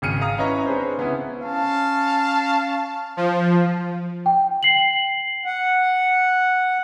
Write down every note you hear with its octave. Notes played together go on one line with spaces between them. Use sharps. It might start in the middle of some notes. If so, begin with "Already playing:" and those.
G#1 C#3 F6 C#7 D#7
F5 A#5 D#6 F6
C#4 E4 B4 C#5 D#5 A#5
C4 D4 G#4 B4 C5
C#3 B3 C#4 E4
C#4 F5 A5
F3
G5
C7 F#7
F#5